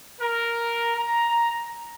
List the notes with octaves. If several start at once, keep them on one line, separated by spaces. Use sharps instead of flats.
A#4
A#5